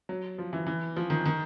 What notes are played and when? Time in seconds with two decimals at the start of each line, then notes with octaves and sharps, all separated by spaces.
0.09 F#3
0.38 F3
0.53 E3
0.67 E3
0.96 F3
1.10 D#3
1.25 D#3